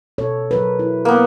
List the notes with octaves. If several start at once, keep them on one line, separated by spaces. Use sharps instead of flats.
B2 A4 C#5
F#3 A#4 B4
E4
A#3 B3